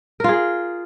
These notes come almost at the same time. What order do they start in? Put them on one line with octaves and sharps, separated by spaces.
A#4 F4 G#4